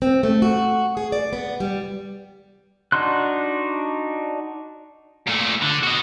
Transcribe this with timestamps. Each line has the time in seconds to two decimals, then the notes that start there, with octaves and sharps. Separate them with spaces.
0.02 C4
0.23 A3
0.42 F#4
0.97 G#4
1.12 D5
1.33 B3
1.60 G3
2.92 D4 D#4 F#4 C6 F#6
5.27 A#2 A3
5.62 D3
5.83 F#4 D#5